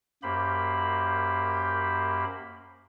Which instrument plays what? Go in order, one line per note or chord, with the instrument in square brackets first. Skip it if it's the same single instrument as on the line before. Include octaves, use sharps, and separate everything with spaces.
[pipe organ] F#2 A#3 G4 C5 B5